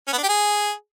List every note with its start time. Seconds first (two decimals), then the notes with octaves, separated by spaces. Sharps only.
0.08 C#4
0.13 B3
0.18 D4
0.23 G4
0.28 G#4